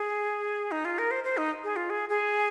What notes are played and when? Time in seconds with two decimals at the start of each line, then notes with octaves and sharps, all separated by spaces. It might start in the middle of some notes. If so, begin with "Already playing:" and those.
Already playing: G#4
0.72 D#4
0.85 F4
0.98 A#4
1.11 C5
1.24 C5
1.37 D#4
1.64 G#4
1.76 F4
1.90 G#4
2.09 G#4